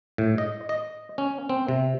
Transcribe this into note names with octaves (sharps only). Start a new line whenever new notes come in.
A2
D#5
D#5
C#4
C4
C3